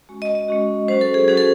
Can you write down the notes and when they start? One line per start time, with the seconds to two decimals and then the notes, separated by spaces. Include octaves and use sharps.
0.09 G#3 C#4 F#4
0.22 D#5
0.35 D#5
0.48 G#3 C#4 F#4
0.88 F#3 C#4 F#4 C5
1.01 A4
1.14 G#4
1.28 F#3 C#4 F#4 G#4
1.37 A4